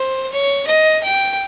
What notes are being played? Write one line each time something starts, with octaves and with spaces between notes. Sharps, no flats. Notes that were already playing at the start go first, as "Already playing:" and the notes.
Already playing: C5
C#5
D#5
G5